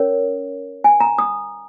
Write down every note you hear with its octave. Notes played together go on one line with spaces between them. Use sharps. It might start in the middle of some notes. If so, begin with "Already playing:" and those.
Already playing: C#4 A#4 C#5
G#5
A#5
D#6